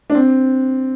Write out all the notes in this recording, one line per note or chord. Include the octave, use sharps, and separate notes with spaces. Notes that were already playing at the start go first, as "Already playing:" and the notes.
D4
C4